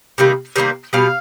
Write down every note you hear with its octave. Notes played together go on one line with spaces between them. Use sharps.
C3 D#3 G3 A#3
C3 D#3 G3 A#3
B2 G3 F5